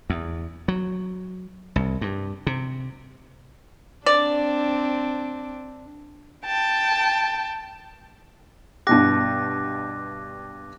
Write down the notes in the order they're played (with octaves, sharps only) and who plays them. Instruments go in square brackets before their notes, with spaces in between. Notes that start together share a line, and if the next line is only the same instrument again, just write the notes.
[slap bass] E2
F#3
C2
G2
C3
[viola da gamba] C4 D4 [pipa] D5
[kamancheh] G5 A5
[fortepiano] G2 B2 G4 [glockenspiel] D6 F#6 A#6